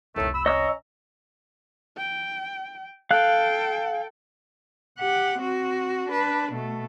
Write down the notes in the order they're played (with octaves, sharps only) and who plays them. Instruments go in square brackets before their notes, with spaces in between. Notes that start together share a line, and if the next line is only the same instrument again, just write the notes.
[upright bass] F1 C2 [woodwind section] A2 D#3 A3
[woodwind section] B5 E6
[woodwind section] C#4 A#5 C#6 [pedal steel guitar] D#5 E6
[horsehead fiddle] G5
[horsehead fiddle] A4 G5 [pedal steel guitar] F5 F#6
[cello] G4 F#5
C4 F#4
D4 B4
B2 A3